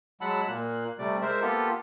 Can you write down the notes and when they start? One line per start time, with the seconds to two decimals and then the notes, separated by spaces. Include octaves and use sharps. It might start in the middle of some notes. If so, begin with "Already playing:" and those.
0.21 F#3 G#3 F#5 A5 B5 E6
0.48 A#2 A#3 F#6
0.99 C3 G3 A3 D5
1.22 G#3 A#4 C5 E5
1.42 A#3 B3 F4 G4 A4